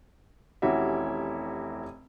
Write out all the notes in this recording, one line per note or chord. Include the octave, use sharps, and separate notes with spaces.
F1 E3 C#4 F#4 G4 E5